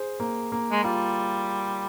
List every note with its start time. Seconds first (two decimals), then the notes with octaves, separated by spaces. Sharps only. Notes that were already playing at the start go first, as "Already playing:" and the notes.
Already playing: G#4 C5
0.20 A#3
0.52 A#3
0.72 G#3
0.83 G3 F4